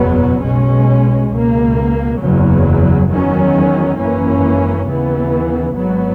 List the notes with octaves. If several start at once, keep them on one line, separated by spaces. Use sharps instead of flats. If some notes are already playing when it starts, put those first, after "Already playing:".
Already playing: F#1 E2 B2 F#3 B3
B1 B2 G#3 C#4
C#2 B2 A#3
F#1 E2 C#3 F#3
E2 D#3 F#3 C#4
G#1 F#2 E3 A#3 C#4
D#2 C#3 E3 B3
G#1 G#2 F#3 B3